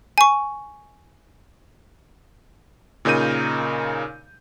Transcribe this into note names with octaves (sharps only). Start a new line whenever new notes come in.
G#5 C#6
A#2 C#3 D#4 A#4 G6 D#7